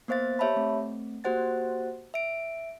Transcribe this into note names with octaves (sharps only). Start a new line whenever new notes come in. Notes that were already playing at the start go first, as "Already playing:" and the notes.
A#3 B3 C5 F5 A6
G4 C#5 E5 A5 B5
A3 C4
A#3 F#4 G4 C5 F#5 A6
E5 D7